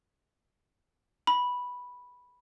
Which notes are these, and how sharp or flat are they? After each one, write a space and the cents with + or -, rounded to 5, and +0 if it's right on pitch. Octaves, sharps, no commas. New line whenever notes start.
B5 -5